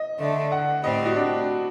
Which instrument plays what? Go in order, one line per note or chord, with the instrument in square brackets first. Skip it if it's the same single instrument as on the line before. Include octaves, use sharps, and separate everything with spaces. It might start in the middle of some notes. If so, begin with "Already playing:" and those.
Already playing: [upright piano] D#5
[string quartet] D3 A3 D4
[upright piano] F#5
[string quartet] A2 G3 C4 [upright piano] D#5
[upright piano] F#4
D4